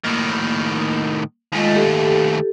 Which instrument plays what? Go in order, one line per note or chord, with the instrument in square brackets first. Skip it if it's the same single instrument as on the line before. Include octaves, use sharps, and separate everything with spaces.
[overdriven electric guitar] A2 D#3 [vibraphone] A#3
[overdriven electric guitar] D#2 A3 [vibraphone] G#3 F4 D#5
[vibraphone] G4 A4